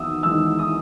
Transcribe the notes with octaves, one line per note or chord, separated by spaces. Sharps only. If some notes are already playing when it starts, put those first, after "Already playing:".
Already playing: E2 D#3 D#6 E6
E2 D#3 G#3 E6
D#6